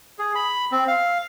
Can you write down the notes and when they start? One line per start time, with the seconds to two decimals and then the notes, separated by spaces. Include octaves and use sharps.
0.19 G#4
0.35 B5
0.72 C4
0.88 F5